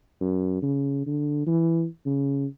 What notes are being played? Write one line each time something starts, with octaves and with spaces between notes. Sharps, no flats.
F#2
C#3
D3
E3
C#3